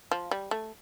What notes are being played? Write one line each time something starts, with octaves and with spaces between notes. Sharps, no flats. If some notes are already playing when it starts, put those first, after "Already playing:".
F3
G3
A3